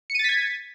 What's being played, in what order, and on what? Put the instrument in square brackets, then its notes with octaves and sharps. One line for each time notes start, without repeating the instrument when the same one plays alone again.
[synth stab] C#7
D#7
A6
B6
G#6